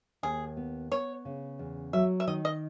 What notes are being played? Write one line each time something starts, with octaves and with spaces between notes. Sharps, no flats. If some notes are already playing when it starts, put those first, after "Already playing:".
D#2 G#4
B3
B3 C#5
C#3
E2
F#3 E5
E5
D#3 D#5
D#5